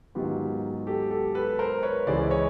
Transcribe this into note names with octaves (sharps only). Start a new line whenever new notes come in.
G#2 D#3 F#3 B3 F4 G4
G4 A4
G4 A4
A4 B4
A#4 C5
B4 C#5
C#2 C#3 E3 G#3 C#4 C5 D5
C#5 D#5